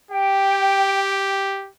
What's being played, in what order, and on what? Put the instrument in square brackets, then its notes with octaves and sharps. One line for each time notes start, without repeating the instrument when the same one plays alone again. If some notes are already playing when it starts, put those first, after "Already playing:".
[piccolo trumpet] G4 [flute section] G5